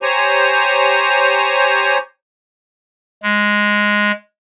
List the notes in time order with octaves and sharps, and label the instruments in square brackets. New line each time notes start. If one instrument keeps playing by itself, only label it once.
[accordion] G4 C5 C#5 G#5 A#5
[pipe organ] G#3